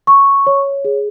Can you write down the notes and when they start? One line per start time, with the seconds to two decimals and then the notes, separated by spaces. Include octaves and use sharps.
0.07 C#6
0.47 C#5
0.85 G#4